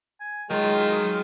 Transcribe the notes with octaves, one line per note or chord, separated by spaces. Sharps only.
G#5
D#3 F#3 G#3 F4